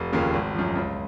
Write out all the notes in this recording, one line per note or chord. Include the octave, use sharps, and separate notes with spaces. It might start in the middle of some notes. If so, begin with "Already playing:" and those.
Already playing: F1
D#2 C#3 F3 A#3
G#1
F#2 F3
C#2